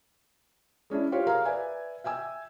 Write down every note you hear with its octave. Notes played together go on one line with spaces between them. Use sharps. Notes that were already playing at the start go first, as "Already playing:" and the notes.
G#3 C#4 D4 E4
F4 G4 C5 C#5
G#4 A#4 F5 A#5
B4 D5 E5 G#5
E5 G5 G#5 E6